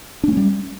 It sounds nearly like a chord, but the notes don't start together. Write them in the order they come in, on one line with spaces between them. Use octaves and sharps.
D4 A3 C#4 G3